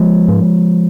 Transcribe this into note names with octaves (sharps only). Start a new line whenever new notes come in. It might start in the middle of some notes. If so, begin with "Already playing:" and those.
Already playing: F3 G#3
G#2